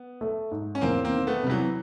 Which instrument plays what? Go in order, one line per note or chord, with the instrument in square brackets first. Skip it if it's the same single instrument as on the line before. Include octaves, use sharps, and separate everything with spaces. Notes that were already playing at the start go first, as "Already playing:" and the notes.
Already playing: [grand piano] B3
[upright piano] A3
G#2
[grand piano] C#4
[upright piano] E2 [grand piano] A#3 C4
[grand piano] A#3 C4
[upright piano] D#3
[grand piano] A3 B3
[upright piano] C3 [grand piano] G3
[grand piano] E3 F#3